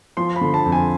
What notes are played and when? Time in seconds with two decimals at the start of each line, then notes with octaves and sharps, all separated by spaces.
0.17 F3 C6
0.36 B5
0.41 D3
0.54 A5
0.66 F2
0.72 G#5